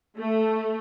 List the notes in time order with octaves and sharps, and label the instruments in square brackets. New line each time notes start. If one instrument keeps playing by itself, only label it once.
[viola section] A3